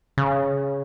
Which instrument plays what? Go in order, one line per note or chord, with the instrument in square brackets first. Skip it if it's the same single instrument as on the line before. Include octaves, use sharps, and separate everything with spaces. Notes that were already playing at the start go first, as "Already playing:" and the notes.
[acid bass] C#3